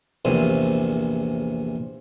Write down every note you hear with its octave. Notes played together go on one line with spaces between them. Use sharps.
A#1 E2 C3